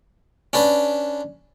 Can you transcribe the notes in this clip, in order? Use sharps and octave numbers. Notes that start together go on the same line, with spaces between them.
C#4 D4 B4